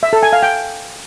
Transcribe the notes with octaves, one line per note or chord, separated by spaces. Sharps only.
E5
A4
G#5
F5
G5